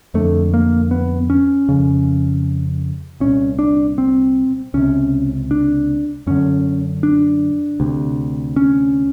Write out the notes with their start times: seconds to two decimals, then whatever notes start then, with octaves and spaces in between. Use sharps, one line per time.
0.14 F2 D3 A3
0.54 A#3
0.91 B3
1.30 C#4
1.69 F2 C#3
3.20 C2 A#2 C#4
3.59 D4
3.98 C4
4.74 C#2 C3 C#4
5.51 D4
6.27 F#2 D3 C#4
7.03 D4
7.80 D2 C3
8.56 C#4